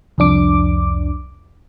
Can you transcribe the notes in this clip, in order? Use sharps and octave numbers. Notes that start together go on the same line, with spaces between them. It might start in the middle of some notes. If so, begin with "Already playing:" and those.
C2 F2 D4 D6